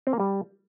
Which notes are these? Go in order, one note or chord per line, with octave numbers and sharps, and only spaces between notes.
C4
A#3
G3